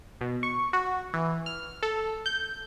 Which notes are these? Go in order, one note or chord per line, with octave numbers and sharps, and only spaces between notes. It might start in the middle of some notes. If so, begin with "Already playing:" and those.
B2
C#6
F#4
E3
F6
A4
G6